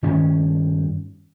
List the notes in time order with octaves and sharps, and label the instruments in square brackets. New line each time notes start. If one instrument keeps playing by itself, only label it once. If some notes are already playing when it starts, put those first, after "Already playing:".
[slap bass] G2 D#3 C#4